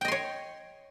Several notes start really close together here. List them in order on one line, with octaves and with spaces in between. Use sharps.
G5 D#5 C6 C#5